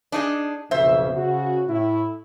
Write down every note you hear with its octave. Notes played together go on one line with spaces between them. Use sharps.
D4 D#4 G#4
B1 F2 C#3 C5 E5
C#3 F#4
A2 E4